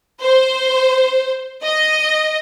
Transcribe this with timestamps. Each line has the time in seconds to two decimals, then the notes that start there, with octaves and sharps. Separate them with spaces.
0.22 C5
1.63 D#5